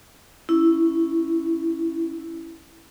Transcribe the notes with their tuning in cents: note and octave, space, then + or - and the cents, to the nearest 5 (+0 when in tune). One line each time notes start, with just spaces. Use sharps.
C#4 +0 E4 +0